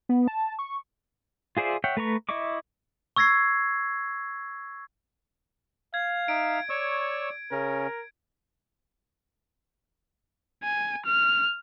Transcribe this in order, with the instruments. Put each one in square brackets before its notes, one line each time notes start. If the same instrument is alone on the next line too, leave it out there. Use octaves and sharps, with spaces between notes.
[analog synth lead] B3
A5
C#6
[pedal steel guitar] F4 G#4 C5 D5 E5
C#5 E5 F#5 G5
A3 B4 A#5 C#6
E4 D#5 E5 C#6 D6
[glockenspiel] C#6 E6 G#6 A#6 C7
[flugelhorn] F5 [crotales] G#6
[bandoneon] D#4 E5 [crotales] D7
[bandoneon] C#5 C#6 E6 [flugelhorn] D5
[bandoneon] C#3 C#4 [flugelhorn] A#4
[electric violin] G#5
F6